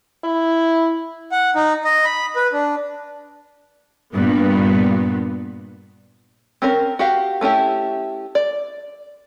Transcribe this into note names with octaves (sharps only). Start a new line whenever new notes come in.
E4
F#5
D#4
D#5
B5
B4
D4
G2 A#2 B3
C4 C#4 A#4
F#4 G4 F5
A3 C#4 E4 G4
D5